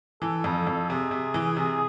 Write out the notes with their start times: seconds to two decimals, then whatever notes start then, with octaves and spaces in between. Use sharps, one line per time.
0.22 E3 A4
0.44 F2
0.67 F2
0.89 C3 G#4
1.11 C3
1.34 E3
1.57 C3